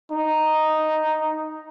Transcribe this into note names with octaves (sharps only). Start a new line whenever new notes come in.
D#4